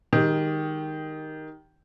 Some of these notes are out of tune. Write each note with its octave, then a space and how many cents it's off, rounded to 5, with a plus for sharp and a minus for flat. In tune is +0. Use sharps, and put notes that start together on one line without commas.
D#3 +0 G#3 -25 G4 +0